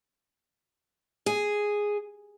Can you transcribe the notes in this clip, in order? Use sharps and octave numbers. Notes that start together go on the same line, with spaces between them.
G#4